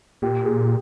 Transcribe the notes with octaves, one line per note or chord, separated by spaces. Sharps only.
A#2 G4
G#4